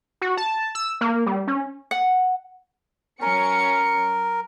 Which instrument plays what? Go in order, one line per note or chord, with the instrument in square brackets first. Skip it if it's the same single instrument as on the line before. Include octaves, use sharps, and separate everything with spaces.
[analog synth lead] F#4
A5
E6
A#3
G3
C#4
[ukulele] F#5
[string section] F#3 C#4 C#7 [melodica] A#4